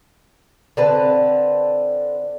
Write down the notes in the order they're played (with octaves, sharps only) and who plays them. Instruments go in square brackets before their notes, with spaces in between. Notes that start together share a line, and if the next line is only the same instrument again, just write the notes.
[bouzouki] D3 C4 B4 A5